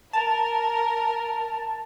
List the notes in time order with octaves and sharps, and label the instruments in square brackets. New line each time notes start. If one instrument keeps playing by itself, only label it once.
[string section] A#4 [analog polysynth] A5